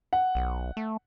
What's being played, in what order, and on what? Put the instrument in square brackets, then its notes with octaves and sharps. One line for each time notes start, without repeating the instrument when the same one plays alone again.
[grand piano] F#5
[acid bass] B1
A3